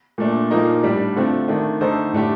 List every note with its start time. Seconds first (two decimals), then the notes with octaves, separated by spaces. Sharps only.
0.18 A#2 A3 D4
0.51 A#2 F3 A#3 D#4
0.83 A2 G3 D4 G4
1.16 D3 A3 C4 F4
1.48 D#3 A3 D4
1.81 D3 A3 D#4 A4 C5
2.13 A2 A3 D4 G4